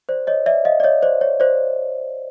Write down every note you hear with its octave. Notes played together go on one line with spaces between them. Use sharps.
C5 D5
C#5 D#5
D5 E5
D#5 F5
D5
C#5 D#5
C5 D5
C#5
C5 D5